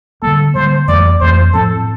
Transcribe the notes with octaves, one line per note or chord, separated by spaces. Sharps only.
D3 G3 A#3 A4
D3 G3 A#3 C5
F2 E3 A3 D5
F2 E3 A3 C5
A2 F3 C4 A4